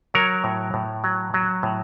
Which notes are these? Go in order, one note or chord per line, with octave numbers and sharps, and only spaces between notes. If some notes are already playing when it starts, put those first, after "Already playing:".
F#3 A#4 C#5
A2
A2
F#3
F#3
A2